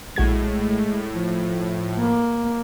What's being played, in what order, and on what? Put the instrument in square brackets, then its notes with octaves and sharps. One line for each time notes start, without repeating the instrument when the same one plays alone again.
[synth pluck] A#1 F#4 G#6 [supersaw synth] A2 [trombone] G#3
[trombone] F3
[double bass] A#3